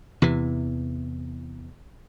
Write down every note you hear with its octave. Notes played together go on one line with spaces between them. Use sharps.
E2 C3 E3